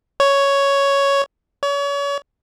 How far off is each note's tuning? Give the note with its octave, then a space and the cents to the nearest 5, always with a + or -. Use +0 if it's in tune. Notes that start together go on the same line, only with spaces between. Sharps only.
C#5 +5
C#5 +35